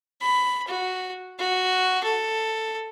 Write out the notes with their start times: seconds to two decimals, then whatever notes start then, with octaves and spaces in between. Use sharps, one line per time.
0.21 B5
0.68 F#4
1.39 F#4
2.04 A4